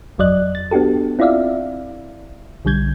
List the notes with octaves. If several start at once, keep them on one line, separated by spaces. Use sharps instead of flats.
G1 F2 F#3 D5 D#5 F#6
A6
B3 D4 F#4 G4 A4
C4 E4 F4 D5 E5 F5
B1 D3 G3 G6 G#6